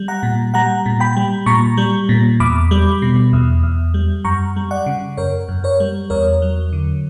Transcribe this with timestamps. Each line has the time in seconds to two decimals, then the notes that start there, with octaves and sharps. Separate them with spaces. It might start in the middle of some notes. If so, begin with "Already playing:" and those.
Already playing: G3
0.08 F#5 A#5
0.23 A#2
0.54 G3 F#5 A#5
0.86 A#2
1.00 G5 B5
1.17 G3
1.46 A#2 A#5 C#6
1.77 G3
2.09 A#2
2.40 E2 B5 D6
2.71 G3
3.02 B2
3.33 E2
3.63 E2
3.94 G3
4.25 F#2 A#5 C#6
4.56 G3
4.71 D5 F#5
4.86 C#3
5.17 F#2 A#4 C#5
5.49 F#2
5.64 A#4 C#5
5.80 G3
6.10 E2 A#4 C#5
6.42 F#3
6.73 D3